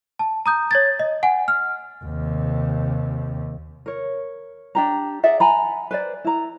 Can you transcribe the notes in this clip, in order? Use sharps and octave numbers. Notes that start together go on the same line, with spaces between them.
A5
A#5 D#6 G6
C#5 G#6 A6
D#5
F#5 G#5
F6
D#2 C3
A#4 C#5
D4 G4 A#5
G#4 D5 E5 F#5
F#5 G#5 A#5 B5
B4 C5 D5
E4 A#5